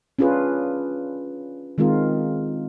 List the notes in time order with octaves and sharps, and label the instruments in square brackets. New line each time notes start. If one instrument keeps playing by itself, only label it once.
[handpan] C#4 D4 F4 G#4 B4
D#3 G#3 C4 F4 A#4